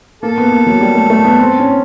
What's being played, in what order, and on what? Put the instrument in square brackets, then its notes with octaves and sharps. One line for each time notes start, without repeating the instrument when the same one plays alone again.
[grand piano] A#3 [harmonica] A4
[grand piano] B3
A#3
F#3
G3
A3
A3
B3
C4
C#4